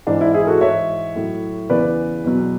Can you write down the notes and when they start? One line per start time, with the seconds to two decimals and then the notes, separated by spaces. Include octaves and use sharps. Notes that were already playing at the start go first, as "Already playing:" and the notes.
0.07 G#2 E3 D4
0.21 E4
0.34 E4 G#4
0.47 F#4 A4
0.61 G#2 E3 C#5 E5
1.15 A2 F#3
1.70 E2 C#3 E3 B4 D5
2.24 E2 B2 F#3